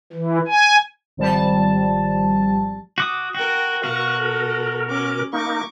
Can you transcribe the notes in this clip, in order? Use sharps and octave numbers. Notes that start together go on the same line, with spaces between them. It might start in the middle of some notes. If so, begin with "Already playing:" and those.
E3
G#5
G#1 F3 G3 A5
F#4 D6 D#6
F#4 A#4 G5
B2 F#4 A#4 F5 C#6
A4
C#4 D6
A#3 D#4 C#6 D6